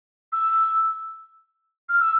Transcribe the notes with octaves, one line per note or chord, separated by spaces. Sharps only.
E6
F6
E6